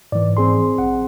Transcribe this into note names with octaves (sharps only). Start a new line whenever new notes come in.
G#2 E3 D5
C4 G#4 C6
A#1 F#5